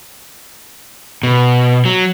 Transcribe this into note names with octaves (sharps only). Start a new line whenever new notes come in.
B2
F#3